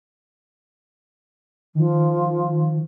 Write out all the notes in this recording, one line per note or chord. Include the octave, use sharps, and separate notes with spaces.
D#3 F3